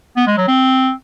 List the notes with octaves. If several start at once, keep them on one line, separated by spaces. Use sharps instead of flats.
B3
G#3
F#3
C4